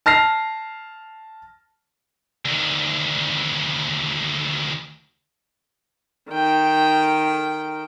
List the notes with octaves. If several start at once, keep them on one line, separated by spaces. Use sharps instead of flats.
A5 F6 A#6 C7
D2 D#3
D#3 G5